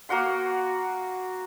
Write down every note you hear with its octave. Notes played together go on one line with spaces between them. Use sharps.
A#3 F#4 F#5 C6